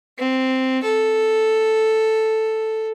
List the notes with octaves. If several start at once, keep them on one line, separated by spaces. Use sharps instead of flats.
C4
A4